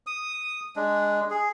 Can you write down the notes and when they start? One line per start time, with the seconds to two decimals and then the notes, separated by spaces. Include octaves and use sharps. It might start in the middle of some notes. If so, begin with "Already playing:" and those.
0.07 D#6
0.76 G#3 D4
1.31 G#4